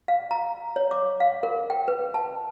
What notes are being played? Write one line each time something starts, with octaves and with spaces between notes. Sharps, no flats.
F5
A#5
C#5
D6
F5
A#4
G5
B4
A5